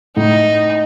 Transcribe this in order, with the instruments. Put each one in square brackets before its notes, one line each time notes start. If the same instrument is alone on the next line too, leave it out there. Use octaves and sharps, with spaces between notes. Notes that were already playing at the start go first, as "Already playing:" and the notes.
[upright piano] A2 [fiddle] D#4